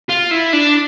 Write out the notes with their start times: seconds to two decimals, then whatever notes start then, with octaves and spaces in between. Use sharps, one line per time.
0.09 F4
0.31 E4
0.53 D4